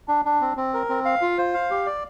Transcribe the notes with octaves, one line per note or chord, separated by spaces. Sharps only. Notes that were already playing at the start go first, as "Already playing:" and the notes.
D4
D4
C4
C4
A#4
C4
F5
F4
C5
F5
G4
D5